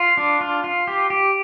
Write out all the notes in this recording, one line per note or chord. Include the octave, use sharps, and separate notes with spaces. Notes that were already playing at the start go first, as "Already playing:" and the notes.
Already playing: F4
D4
F4
F4
G4
G4